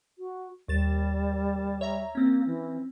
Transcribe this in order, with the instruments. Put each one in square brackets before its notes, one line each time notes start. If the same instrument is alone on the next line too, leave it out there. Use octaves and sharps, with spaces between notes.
[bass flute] F#4
[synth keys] D#2 A6 E7 [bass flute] G3
[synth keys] C#5 E5 A#5
[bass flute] A#3 [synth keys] C4 C#4
[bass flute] E3